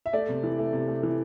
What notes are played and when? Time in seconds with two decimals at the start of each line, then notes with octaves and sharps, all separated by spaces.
0.06 E5
0.13 A3 D5
0.29 C3
0.43 E3
0.59 A3
0.73 C3
0.88 A3
1.03 E3